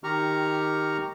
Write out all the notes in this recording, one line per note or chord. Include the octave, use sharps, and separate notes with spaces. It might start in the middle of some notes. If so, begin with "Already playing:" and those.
D#3 G4 A#5 C#6 F6